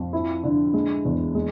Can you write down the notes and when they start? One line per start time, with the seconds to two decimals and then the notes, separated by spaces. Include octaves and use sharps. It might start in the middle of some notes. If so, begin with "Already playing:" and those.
Already playing: F2
0.13 E4
0.44 D3
0.74 G#3
1.05 E2
1.35 G#3